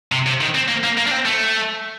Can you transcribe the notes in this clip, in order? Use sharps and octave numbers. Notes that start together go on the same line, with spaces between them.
C3
C3
D#3
C4
A#3
A#3
A#3
D4
C4
A3